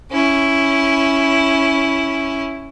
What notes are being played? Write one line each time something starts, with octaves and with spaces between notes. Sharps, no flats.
C#4 E4